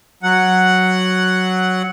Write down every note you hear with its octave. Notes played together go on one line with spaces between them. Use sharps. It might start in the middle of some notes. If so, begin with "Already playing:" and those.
F#3 F#5